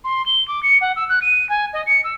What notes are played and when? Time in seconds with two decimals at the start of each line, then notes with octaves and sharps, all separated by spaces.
0.04 C6
0.26 G7
0.48 D6
0.63 C#7
0.81 F#5
0.96 E6
1.09 F#6
1.22 D#7
1.49 G#5
1.73 D#5
1.86 C#7
2.04 E6